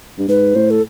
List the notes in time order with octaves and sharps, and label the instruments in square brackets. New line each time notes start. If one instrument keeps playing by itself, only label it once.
[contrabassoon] G2
[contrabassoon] G#2 [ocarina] B4
[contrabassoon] A2 [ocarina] C5
[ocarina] A4